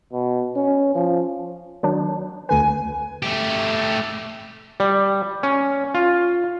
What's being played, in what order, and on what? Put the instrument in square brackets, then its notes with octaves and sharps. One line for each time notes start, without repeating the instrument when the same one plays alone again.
[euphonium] B2
C#4
F3
[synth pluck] D#3 F#3 D4
[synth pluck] D2 D3 B4 [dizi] G#5
[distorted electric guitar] A3 G4
[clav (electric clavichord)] G3
C#4
F4